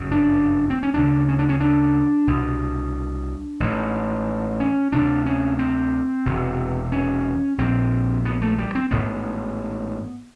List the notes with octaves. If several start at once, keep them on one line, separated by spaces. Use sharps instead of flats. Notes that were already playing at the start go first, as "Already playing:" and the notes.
Already playing: G1 F#2 C#3
D4
C4
C#4
D2 C#3 D4
C#4
D4
C#4
D4
C2 B2
A1 G#2
C#4
D2 C3 D4
C#4
C4
E1 E2 C3
C#4
A#1 A#2 C4
B3
A3
G3
C4
A1 G#2 B3